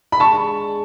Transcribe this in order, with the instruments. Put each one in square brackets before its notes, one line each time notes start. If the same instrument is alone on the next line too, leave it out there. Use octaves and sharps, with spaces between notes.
[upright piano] B5
[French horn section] G#3 D4 G#4 [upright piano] A5 C#6